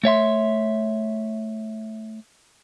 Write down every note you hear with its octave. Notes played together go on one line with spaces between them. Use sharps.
A3 C#5 E5 C6